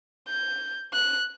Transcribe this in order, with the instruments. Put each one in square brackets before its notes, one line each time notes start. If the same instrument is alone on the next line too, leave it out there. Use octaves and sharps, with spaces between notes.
[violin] G6
F#6